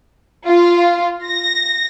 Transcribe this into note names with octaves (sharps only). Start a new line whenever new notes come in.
F4
A#6